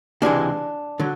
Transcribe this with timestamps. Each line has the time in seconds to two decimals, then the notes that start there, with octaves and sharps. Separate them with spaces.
0.22 C#2 C3 E3 G#3 D4
1.00 D3 F#3